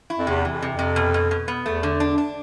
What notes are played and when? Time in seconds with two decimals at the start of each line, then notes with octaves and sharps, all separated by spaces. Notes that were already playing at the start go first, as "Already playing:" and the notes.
0.10 E4
0.18 F2
0.27 E2 C3
0.45 E3
0.51 F2
0.62 C3
0.74 F2 C3
0.96 B2
1.14 B2
1.31 B2
1.48 B3
1.66 E2 A3
1.83 D3
2.00 D4
2.18 D4